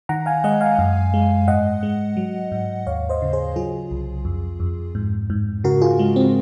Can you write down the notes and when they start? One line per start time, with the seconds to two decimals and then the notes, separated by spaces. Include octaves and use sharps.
0.09 D#3 F#5 A#5
0.26 F5 G#5
0.44 G#3 D#5 F#5
0.61 F5 G#5
0.79 F#2
1.14 G#3
1.48 G#2 D#5 F#5
1.83 G#3
2.17 F#3
2.52 G#2
2.87 D#2 C#5 F5
3.09 C5 D#5
3.22 C#3
3.33 G#4 C5
3.56 F#3 F4 G#4
3.91 C2
4.25 F2
4.60 F2
4.95 G#2
5.30 G#2
5.64 C#3 F#4 A#4
5.81 F4 G#4
5.99 G#3
6.16 C4